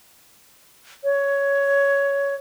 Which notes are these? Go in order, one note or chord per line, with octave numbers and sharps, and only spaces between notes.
C#5